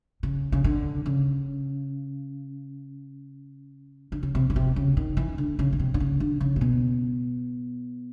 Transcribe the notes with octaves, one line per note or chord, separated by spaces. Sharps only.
C#3
C#3
D3
C#3
D3
C#3
C3
C#3
C3
C#3
D#3
E3
D3
C#3
C#3
C3
D3
C#3
D3
C#3
A#2
B2